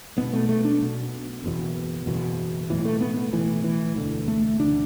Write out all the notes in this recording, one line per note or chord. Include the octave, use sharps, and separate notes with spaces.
B1 B2 B3
A3
A3
D4
B1 B2
F#1 E2 B2
F#1 E2 B2
B1 A2 E3
A3
B3
A3
B1 A2 E3
E3
E1 D2 D3
A3
E1 D2 D3 D4